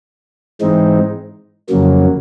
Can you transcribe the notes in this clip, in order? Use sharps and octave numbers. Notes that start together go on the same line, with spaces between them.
G#2 E3 G#3 C4 D#4
F2 C#3 F#3 A#3